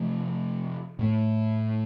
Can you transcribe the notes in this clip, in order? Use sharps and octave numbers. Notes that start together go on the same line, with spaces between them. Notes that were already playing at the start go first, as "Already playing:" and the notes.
Already playing: C3 F3 A3
A2 A3